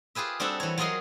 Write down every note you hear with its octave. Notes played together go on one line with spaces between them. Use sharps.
F4 G4 G#4 B4 E5
G3 C4 D4 F#4 A4 E5
E3 C#5
F#3 F4 G#4 A#4 D#5 C6